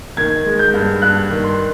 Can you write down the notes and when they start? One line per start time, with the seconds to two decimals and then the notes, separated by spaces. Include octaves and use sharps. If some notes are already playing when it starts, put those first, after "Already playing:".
0.17 D#3 G#6
0.46 G#3
0.59 G6
0.74 G2
1.02 G2 F#6
1.30 D#3
1.44 C6